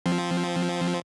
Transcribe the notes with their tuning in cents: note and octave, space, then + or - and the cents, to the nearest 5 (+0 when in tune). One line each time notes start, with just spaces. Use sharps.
F3 +0 C4 +0